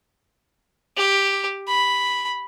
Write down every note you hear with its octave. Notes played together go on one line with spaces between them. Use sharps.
G4
B5